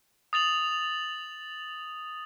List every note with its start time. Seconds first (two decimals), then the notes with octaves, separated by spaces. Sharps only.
0.33 D#6 A6 F7 F#7